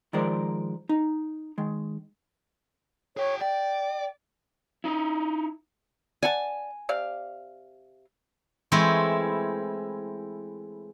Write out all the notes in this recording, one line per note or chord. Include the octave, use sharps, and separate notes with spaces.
D#3 F3 G#3 A#4 C5 D5
D#4
D#3 G#3
G#4 C#5 G5
D5 G5
D#4 E4
D5 F#5 G#5 A5
C3 D5 F5
E3 G#3 A3 C4 E4